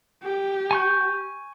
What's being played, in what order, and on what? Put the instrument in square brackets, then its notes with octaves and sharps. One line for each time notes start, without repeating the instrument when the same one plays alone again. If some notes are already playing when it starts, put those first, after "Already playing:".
[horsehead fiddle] G4
[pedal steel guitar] G#5 C#6 G6